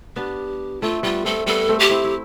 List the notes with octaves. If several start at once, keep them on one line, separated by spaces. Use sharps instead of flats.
B3 D4 G4
A3 C4 F4
G3 B3 F4
A3 C4 A4
G3 B3 A4
A3 C4
G4
C4 E4
E4